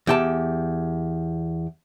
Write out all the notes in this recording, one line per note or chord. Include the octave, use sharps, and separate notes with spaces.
E2 G4 A5